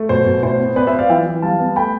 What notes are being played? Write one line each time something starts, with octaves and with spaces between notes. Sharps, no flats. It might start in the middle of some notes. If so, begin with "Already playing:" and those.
Already playing: A3
B2 C5
B2
A2 C5
B3
B3 B4 D5
C5 E5
B3
D5 F5
E3 E5 G5
E3
G3 F5 A5
B3
A3 G5 B5